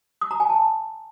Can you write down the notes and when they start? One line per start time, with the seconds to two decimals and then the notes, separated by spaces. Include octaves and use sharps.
0.21 D#6
0.31 A#5
0.40 G#5
0.49 A5